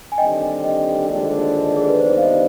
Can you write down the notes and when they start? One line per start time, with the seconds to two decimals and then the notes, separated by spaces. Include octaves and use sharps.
0.12 G#5
0.18 D#2 D3 G3 C4 G4 D#5 G5
0.64 D#5 G5
1.10 D#2 D3 F3 G#3 D4
1.76 G#4
1.88 B4
1.99 C3 D#3 G3 B3 D4 C5
2.18 F5
2.22 C5 D#5